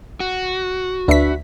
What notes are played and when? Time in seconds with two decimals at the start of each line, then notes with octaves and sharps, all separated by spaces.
0.20 F#4
1.08 D2 D4 B4 E5 B6